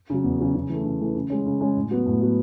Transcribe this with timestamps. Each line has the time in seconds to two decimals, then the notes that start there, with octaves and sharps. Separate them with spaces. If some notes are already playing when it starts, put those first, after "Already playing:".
0.10 C#3 F#3
0.24 E2
0.39 C#3 F#3
0.55 C#3
0.69 E3 A3
0.84 C#3
1.01 E3 A3
1.15 C#3
1.30 G#3 C#4
1.46 C#3
1.61 G#3 C#4
1.76 A2
1.91 F#3 B3 F#4
2.06 A2
2.21 F#3 B3 F#4